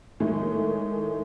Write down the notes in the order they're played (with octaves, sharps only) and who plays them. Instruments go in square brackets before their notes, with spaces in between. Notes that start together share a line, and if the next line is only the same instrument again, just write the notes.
[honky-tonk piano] A2 D#3 G#3 A3